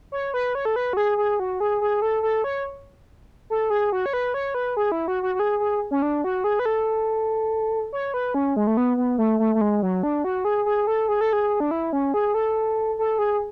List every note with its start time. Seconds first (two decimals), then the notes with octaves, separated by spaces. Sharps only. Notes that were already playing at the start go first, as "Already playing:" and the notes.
0.12 C#5
0.34 B4
0.55 C#5
0.65 A4
0.76 B4
0.93 F#4
0.97 G#4
1.17 G#4
1.40 F#4
1.60 G#4
1.81 G#4
2.02 A4
2.23 A4
2.44 C#5
3.50 A4
3.70 G#4
3.92 F#4
4.06 C#5
4.13 B4
4.34 C#5
4.54 B4
4.77 G#4
4.92 E4
5.08 F#4
5.23 F#4
5.35 F#4
5.39 G#4
5.60 G#4
5.91 C#4
6.02 D4
6.24 F#4
6.44 G#4
6.59 B4
6.65 A4
7.93 C#5
8.14 B4
8.34 C#4
8.56 G#3
8.67 A3
8.77 B3
8.97 B3
9.18 A3
9.39 A3
9.55 A3
9.61 G#3
9.83 F#3
10.03 D4
10.24 F#4
10.45 G#4
10.66 G#4
10.87 A4
11.09 G#4
11.21 A4
11.33 G#4
11.60 D4
11.71 E4
11.93 C#4
12.14 G#4
12.34 A4
12.99 A4
13.19 G#4